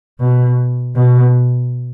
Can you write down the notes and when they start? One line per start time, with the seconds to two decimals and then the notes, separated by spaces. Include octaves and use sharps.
0.20 B2
0.96 B2